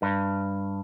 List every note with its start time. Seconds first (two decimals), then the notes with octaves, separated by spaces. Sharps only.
0.02 G2